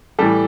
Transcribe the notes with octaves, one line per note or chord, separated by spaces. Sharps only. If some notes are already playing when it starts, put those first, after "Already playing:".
A2 E3 G3 A4